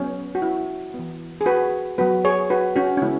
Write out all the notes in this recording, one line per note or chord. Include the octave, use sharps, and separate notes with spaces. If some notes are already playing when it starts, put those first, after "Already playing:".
Already playing: F#3 B3 C#4
F#4
E4
E3 B3
G#4
F#4 B4
F#3 B3 F#4 B4
G#4 C#5
F#4 B4
C#4 F#4
C#4
C#3 G#3 B3 E4